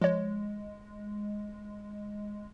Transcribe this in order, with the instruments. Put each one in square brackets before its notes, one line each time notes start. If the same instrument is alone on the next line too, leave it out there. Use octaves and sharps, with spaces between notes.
[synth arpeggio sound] F3 C#5 [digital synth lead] G#3